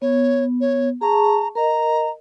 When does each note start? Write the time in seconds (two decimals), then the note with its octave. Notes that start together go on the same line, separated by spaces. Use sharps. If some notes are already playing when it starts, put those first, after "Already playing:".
0.02 B3 C#5
0.61 C#5
1.01 G#4 A5 A#5 C#6
1.55 A#4 D#5 A#5